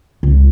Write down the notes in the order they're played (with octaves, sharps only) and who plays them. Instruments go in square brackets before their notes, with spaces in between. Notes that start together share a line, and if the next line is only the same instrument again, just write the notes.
[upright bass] C#2